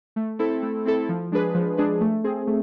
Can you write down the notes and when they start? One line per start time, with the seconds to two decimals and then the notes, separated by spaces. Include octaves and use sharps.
0.16 A3
0.39 C4 E4 A4
0.62 A3
0.86 C4 E4 A4
1.09 F3
1.32 G#3 D4 G#4 B4
1.54 F3
1.78 G#3 D4 G#4 B4
2.01 A3
2.24 C4 G#4
2.47 A3